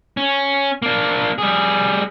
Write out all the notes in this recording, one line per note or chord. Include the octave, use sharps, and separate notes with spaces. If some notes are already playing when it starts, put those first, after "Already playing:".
C#4
A#3 D4
G3 G#4